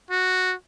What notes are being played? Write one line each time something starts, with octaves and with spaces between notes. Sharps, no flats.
F#4